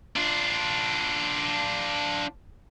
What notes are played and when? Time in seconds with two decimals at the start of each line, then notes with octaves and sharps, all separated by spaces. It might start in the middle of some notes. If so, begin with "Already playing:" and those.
0.16 D4 F4